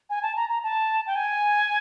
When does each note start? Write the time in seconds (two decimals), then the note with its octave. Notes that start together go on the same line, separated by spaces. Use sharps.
0.10 G#5
0.23 A5
0.36 A#5
0.49 A#5
0.63 A5
1.07 G5
1.16 G#5